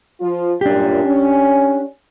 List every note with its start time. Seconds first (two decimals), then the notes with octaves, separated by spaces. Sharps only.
0.20 F3 F4
0.61 F#2 A#2 D4 G4
1.04 C#4